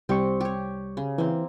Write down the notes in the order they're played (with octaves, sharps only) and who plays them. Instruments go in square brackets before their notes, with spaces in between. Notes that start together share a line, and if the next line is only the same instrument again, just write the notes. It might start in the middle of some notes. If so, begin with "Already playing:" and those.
[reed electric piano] C2 G3 C#6 [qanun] C4 G4
[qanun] G4 C#5
C#3
[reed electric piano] E3 [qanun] A#3 C4